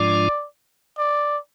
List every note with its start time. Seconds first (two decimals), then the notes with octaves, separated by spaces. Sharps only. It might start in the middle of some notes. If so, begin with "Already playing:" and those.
Already playing: G#2 F3 G#3 D4 F4 D5
0.98 D5